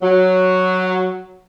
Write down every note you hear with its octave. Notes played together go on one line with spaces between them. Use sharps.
F#3